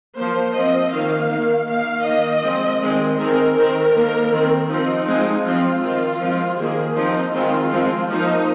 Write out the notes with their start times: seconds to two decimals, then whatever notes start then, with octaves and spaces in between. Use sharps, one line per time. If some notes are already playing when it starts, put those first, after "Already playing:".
0.16 F3 A#3 C5
0.54 F3 C4 D#5
0.91 D#3 A#3 F5
1.29 D#3 A#3
1.67 D#3 A#3 F5
2.05 D#3 A#3 D#5
2.43 F3 G#3 C4
2.81 D#3 G#3 C4
3.18 D#3 G#3 C4 A#4
3.56 D#3 C4 A#4
3.94 D#3 A#3
4.32 D#3 C4
4.69 F3 C4 D#4
5.07 F3 G#3 C4
5.44 F3 C4 F4
5.82 D#3 C4 F4
6.20 F3 G#3 C4
6.58 D#3 A#3 G#4
6.96 F3 C4 D#4
7.33 D#3 G#3 C4 F4
7.71 F3 G#3 C4
8.09 F3 A#3 D#4